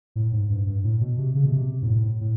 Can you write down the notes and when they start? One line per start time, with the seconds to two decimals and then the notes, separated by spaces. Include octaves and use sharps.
0.16 A2
0.32 G#2
0.49 G2
0.66 G2
0.84 A2
1.01 B2
1.18 C3
1.35 C#3
1.46 B2
1.52 C3
1.82 G#2
1.86 A2
2.21 A2